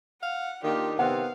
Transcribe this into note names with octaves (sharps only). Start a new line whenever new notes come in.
F5 F#5
D#3 A#3 D4 F4 G4
C3 D#3 B3 C4 F5 F#5